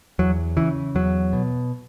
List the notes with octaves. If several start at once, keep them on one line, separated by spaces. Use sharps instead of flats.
E2 F#3
C#3 E3
E2 F#3
B2